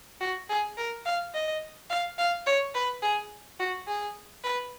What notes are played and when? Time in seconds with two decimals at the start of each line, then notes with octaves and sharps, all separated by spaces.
0.21 F#4
0.49 G#4
0.77 A#4
1.06 F5
1.34 D#5
1.90 F5
2.18 F5
2.46 C#5
2.75 B4
3.02 G#4
3.59 F#4
3.88 G#4
4.44 B4